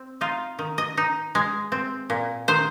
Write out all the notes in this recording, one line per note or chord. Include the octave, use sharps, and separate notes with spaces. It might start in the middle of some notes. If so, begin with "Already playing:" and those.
Already playing: C4
D#4 F4
D#3
D#5
D#4
G#3
C4
A#2
D#3 C5